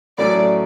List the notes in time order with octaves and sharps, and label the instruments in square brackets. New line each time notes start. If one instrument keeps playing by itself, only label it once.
[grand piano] A2 F#3 A3 C#4 [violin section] D5